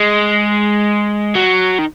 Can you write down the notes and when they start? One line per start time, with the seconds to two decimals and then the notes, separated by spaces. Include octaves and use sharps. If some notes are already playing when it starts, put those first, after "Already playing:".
Already playing: G#3
1.35 F#3
1.78 D#3